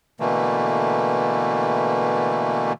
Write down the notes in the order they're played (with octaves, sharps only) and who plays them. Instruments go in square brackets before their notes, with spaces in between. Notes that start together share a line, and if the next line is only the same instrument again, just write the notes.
[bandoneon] B2 D3 E3 A3 A#3